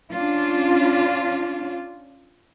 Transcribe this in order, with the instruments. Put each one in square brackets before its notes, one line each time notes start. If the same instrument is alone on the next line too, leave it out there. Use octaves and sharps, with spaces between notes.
[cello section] C#4 D4 F4